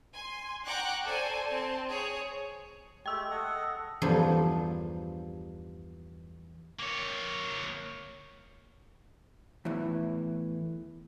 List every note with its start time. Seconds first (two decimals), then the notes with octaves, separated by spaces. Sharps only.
0.14 G#5 C6
0.65 F#5 G5 A#5 C#6 D6 F#6
1.05 A4 C5 D5 G#5 A5
1.48 C4 A5
1.89 G#4 C#5
3.06 G#3 A3 G4 G5 E6
3.31 A4 D#5 F#5
4.02 E2 G2 F3 D4 D#4
6.79 A#3 C#5
9.65 E2 A2 E3